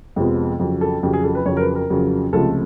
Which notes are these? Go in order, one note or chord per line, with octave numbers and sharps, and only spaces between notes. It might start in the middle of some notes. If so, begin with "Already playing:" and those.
F2 C3 F3 G#3 B3
F2 C#3 F#3
A4
F2 C#3 F#3 G4
G#4
A4
B4
F2 C#3 F#3 C#5
A#4
B4
A#4
F2 C#3 F#3
C#2 C3 F3 A3 A4